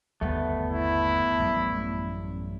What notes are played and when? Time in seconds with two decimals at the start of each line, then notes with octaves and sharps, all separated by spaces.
0.21 G1 D#2 G3 A3 B3
0.70 E4
1.39 A1 F#2 G3